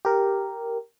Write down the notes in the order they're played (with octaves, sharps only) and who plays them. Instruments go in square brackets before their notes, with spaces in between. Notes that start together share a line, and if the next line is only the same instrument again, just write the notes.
[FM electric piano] G4 A#4